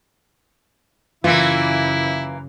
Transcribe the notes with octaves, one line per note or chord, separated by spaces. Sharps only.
F#2 C#3 E3 A#3 E4 F4